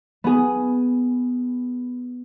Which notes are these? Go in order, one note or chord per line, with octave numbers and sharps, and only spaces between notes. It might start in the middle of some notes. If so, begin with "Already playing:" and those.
B3 G#4